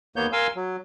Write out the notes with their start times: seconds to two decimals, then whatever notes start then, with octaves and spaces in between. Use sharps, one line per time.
0.16 D#2 A#3 B3 C#5 G6
0.32 A#4 F5 G#5 C6 E6
0.56 F#3